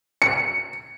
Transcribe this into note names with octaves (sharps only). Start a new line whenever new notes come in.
C#7